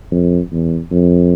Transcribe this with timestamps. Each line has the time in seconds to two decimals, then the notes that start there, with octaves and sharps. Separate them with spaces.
0.11 F2
0.52 E2
0.92 F2